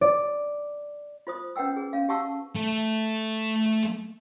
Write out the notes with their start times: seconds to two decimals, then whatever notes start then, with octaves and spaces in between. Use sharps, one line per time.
0.01 D5
1.27 F4 C5 D#6
1.56 C#4 B4 F#5 G5 E6
1.76 G#4
1.93 C#4 F5
2.09 G4 F5 F#5 A5 C#6 E6
2.55 A3 A4